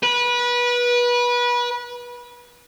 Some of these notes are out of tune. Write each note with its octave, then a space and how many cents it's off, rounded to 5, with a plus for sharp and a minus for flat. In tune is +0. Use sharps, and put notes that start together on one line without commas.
B4 -25